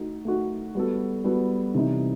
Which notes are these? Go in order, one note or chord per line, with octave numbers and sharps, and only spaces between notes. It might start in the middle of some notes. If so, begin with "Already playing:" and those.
Already playing: A3 D#4 F#4
A3 D#4 F#4
G3 B3 F#4 A4
G3 B3 F#4 A4
C3 E3 G3 D#4